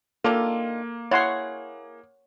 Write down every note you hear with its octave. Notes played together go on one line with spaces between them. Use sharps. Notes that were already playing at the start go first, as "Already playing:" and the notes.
D#3 A#3 D4 F4 A4
E4 G#4 C#5 F#5 C6